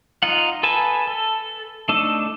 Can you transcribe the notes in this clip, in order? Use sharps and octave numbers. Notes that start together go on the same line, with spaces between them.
D#4 F4 F#5
A4 B4 G#5 A5
A4
A3 D4 D#4 A4